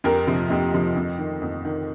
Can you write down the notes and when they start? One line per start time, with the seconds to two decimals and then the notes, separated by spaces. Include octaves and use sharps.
0.04 F2 G4 A#4
0.27 C3 F3
0.50 F2 D#4 G4
0.74 C3 F3
0.95 F2
1.18 D#3
1.42 F2
1.65 D#3